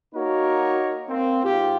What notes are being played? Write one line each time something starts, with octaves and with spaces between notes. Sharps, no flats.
A#3 D#4 F#4 A#4 C#5
A#3 C4
G#2 F4 G4